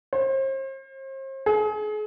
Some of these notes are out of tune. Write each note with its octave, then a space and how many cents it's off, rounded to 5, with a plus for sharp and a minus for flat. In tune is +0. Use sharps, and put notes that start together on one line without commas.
C5 +40
G#4 +35